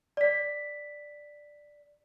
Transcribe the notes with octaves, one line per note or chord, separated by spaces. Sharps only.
D5 B6